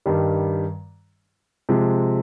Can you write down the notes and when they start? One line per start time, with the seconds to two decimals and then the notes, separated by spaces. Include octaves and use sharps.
0.06 G2 D#3 G3
1.69 C3 F3 G#3